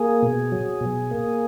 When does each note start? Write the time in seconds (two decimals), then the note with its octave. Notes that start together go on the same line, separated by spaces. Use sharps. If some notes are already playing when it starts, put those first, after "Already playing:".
Already playing: A#3 G#4
0.23 B2
0.52 F#3
0.81 B2
1.11 A#3